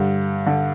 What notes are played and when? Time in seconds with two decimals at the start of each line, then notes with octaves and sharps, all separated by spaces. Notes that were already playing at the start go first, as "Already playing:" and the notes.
Already playing: G2 D3
0.46 D3